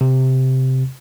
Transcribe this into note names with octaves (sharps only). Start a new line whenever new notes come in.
C3